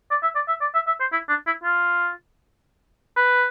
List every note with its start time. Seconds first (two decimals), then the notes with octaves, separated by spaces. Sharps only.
0.11 D5
0.23 E5
0.35 D5
0.48 E5
0.61 D5
0.75 E5
0.87 E5
1.00 C5
1.12 E4
1.29 D4
1.46 E4
1.63 F4
3.17 B4